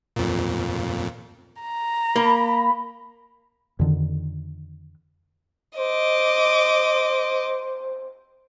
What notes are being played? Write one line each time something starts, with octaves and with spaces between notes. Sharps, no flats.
F2 A#2
A#5
A#3 B5
F2 D3 D#3
C5 D#5 D6